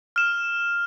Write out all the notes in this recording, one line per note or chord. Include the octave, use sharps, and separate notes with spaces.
F6 E7